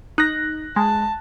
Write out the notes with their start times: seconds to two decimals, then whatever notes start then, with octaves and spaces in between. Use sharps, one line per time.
0.18 D#4 F#6 A#6
0.76 G#3 A5